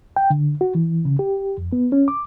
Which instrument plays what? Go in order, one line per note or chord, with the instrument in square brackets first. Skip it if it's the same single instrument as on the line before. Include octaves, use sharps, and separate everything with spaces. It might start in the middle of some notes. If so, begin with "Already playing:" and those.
[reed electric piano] G5
D3
F#4
E3
C#3
G4
F2
B3
C#4
D6